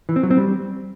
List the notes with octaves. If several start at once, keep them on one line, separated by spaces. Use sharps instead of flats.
E3
C4
F#3
C4
G3